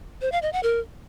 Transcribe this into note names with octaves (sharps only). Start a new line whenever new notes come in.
C5
F5
D#5
F#5
A#4